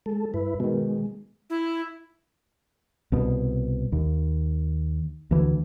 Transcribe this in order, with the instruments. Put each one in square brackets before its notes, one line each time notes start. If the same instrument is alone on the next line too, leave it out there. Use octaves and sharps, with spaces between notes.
[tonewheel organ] G#3 A4
G2 E4 B4
[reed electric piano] B2 D#3 [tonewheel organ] G#3
[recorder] E4
[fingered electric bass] C2 B2
D#2
D2 E3